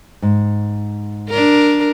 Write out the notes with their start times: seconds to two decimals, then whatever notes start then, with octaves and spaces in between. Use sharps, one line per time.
0.22 G#2
1.29 D4 A#4